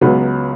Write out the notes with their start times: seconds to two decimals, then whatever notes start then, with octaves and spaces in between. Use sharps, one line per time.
0.01 C#2 C#3 F#3 B3